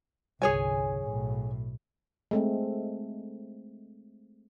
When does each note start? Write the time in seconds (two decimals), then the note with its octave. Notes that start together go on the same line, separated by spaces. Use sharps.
0.42 G1 C2 G#4 C#5 G#5
1.02 B1 A2
2.31 G#3 A3 C4